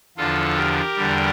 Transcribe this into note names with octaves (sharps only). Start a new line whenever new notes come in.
E2 D3 F3 F4 A4
G4 A#4
E2 D3 G3